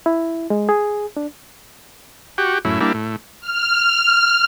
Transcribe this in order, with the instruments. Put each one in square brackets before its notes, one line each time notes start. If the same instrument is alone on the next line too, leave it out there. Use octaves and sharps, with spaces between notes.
[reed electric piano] E4
G#3
G#4
D4
[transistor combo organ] F#4 G4
F#2 A2 E4
G3 A#3 D4 E4
A2
[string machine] F6